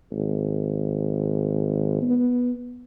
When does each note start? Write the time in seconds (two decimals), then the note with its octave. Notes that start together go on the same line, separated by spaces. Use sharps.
0.12 G#1
2.02 B3